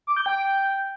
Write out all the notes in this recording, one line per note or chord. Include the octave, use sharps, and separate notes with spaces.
D6
G6
G5